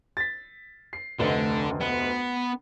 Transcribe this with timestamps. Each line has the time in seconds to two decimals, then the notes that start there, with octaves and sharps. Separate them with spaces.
0.17 A6 B6
0.93 C7
1.19 F1 D2 D3 D#5
1.81 B3